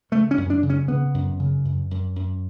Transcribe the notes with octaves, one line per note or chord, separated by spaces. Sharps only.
C#3 A3
C#4
F#2
D4
C#3
C#4
C#3 B3
F#2
C#3
F#2
F#2
F#2